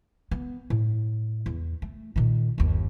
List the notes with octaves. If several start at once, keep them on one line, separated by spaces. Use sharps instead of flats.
B3
A2
E2
A3
A#2 D#3
G1 D#2